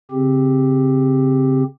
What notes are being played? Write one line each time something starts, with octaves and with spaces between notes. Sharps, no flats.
C#3 C4 G4